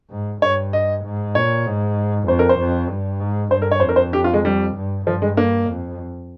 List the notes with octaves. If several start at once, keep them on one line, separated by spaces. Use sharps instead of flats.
G#2
G2 C#5
D#5
G#2
A#2 C#5
G#2
F2 C5
A#4
C5
F2
G2
G#2
G2 C5
A#4
C#5
F2 C5
A#4
C5
G4
F4
G#3
G3
G2
G2 F3
G#3
A#3
F2